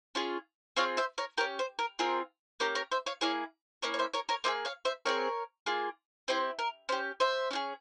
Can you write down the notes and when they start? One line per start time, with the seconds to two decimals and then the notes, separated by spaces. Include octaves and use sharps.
0.15 C#4 F4 G#4
0.77 C4 F4 G#4 C#5 F5
0.97 C5 E5
1.18 A#4 C#5
1.37 C#4 G4 A#4
1.59 C5
1.79 A#4
1.99 C4 F4 G#4 A#4
2.60 A#3 C#4 G4 A#4
2.75 A#4 C#5
2.91 C5 E5
3.06 C#5 F5
3.21 A#3 E4 G#4 C#5 F5
3.82 A#3 C#4 E4 A#4 C#5
3.94 C#5
3.99 C5 E5
4.13 A#4 C#5
4.29 A#4 C#5
4.44 A#3 E4 G#4 C5 E5
4.65 C#5 F5
4.85 C5 E5
5.05 C4 E4 G#4 A#4 C#5
5.66 A#3 F4 G#4
6.28 C4 E4 G4 C5
6.59 A#4
6.89 C#4 G4 C5
7.20 C5 E5
7.51 C#4 F4 G#4